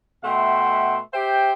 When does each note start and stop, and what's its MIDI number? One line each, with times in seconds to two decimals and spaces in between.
0.24 0.98 47
0.24 0.98 57
0.24 0.98 76
0.24 0.98 78
0.24 0.98 79
0.24 0.98 84
1.14 1.53 67
1.14 1.53 72
1.14 1.53 76
1.14 1.53 79